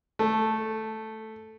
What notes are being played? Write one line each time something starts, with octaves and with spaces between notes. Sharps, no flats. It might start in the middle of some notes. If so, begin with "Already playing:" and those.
A3